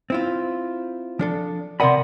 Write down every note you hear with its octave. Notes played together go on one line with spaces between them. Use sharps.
C4 E4 F4
F3 D4 A4
C3 A#4 D5 D#5 F#5 B5 C6